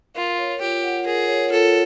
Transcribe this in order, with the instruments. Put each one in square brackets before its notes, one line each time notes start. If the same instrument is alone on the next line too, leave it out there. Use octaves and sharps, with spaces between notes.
[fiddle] F4 [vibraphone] A#4
[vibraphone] C#5
[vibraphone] F4 [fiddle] G4
[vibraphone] F#5
[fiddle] G#4 [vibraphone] A#4
[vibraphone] C#5
[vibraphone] F4 [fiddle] A4